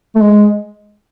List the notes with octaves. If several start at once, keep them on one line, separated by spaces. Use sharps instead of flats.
A3
G#3